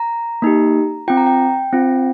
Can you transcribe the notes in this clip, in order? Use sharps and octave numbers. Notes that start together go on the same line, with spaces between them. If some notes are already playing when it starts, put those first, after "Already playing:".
Already playing: A#5
A#3 D#4 G4
C4 F4 G5
A#5
G5
C4 F4